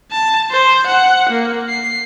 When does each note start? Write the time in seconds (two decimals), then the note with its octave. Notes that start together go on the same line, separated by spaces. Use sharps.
0.11 A5
0.51 C5
0.87 F#5
1.30 A#3
1.69 C7